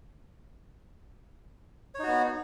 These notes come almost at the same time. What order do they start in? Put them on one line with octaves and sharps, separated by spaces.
C#5 D#4 F#4 B3